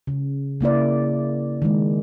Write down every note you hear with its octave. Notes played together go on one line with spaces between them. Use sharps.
C#3
C#3 A#3 E4 D5
D#3 G#3